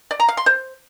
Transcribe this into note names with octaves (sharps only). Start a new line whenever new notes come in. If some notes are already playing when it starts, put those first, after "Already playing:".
D5
A#5
F5
C6
C5